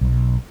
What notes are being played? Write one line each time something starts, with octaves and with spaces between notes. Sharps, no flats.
B1